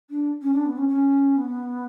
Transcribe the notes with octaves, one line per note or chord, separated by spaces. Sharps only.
D4
C#4
D4
B3
C#4
C#4
B3